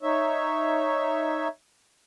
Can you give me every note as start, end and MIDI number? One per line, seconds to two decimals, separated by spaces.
0.03 1.48 63
0.03 1.48 73
0.03 1.48 76